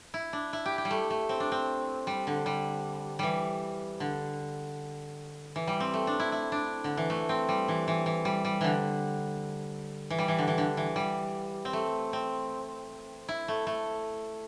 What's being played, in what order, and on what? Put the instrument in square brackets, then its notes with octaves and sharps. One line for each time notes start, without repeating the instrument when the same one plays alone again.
[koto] E4
D4
E4
G4
G4
G3
A3
A3
C4
D4
C4
G3
D3
G3
E3 G3
D3
E3
G3
C4
A3
D4
E4
E4
D4
D3
E3
A3
C4
G3
E3
E3
E3
G3
G3
D3 E3
E3
G3
E3
D3
E3
D3
E3
G3
C4
A3
C4
E4
A3
A3